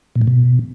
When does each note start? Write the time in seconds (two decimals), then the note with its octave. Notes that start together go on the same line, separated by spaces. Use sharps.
0.16 A#2
0.21 A2
0.27 B2